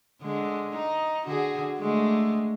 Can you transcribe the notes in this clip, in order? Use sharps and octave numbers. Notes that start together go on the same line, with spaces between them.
D3 G#3
D#4
D3 F#4 G#4
D3 G#3 A3